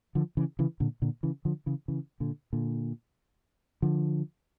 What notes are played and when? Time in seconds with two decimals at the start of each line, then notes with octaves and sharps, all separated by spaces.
0.15 D3 F3
0.37 C#3 E3
0.59 C#3 E3
0.80 A#2 D3
1.02 A#2 D3
1.23 C#3 E3
1.45 D3 F3
1.66 C#3 E3
1.88 C#3 E3
2.20 A#2 D3
2.53 A#2 D3
3.82 D3 F3